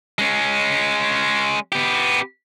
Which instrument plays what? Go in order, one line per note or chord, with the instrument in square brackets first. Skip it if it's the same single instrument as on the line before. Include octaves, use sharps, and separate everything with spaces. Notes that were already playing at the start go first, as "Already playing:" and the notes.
[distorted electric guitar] G#3 C#4
B3 G4